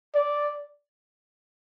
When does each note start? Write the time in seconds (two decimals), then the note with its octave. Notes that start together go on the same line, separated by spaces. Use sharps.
0.15 D5